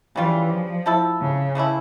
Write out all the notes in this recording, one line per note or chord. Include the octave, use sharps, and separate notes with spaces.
C#3 E3 G3 C#4 F4
F3
F3 A3 E4 A4
C#3
C#3 E3 A3 E4